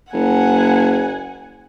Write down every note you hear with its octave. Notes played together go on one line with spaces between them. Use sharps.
F#1 F#5 G#5